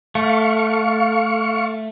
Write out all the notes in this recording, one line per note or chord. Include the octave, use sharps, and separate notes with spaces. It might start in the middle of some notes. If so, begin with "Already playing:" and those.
A3 F5 C#6